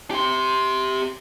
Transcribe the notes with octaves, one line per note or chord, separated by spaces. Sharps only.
G4 C6